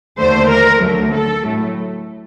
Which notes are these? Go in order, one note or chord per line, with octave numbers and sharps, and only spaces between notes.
D#2 D3 A3 C5
A#4
D2 D3 F#3 A3
A4
A2 F#3 A3